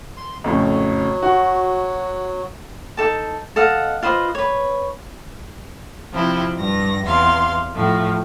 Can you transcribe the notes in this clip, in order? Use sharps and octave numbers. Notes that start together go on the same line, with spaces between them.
C6
F2 A2 C#3 F#3
F#4
D#4 A4 A5
A4 D#5 F5 F#5
F4 B4 C5 D#5
B4 C#5
C3 F3 C4 E4
G2 A#6
E2 C3 F5 C6
A2 F3